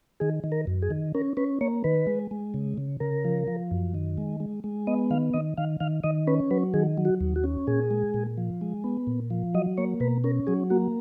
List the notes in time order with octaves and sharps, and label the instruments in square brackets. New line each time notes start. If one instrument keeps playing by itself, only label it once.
[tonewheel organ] D#3 G#4
D#3
A#4
F#2
G#4
D#3
C#4 A#4
C#4 B4
A#3 C#5
D#3 B4
G#3
G#3
C#3
C#3
C#3 A#4
F3
F3
F#2
D#3
G#3
G#3
G#3
B3 D#5
D#3 F5
D#3 D#5
D#3 F5
D#3 F5
D#3 D#5
C#4 B4
F#3 B4
D#3 G#4
F#3
F#4
D#2
F#4
C#4
A#2 G#4
G#3
A#2
F3
G#3
B3
A#2
F3
F#3 D#5
A#3 C#5
B2 B4
C#4 A#4
F#3 G#4
A#3 F#4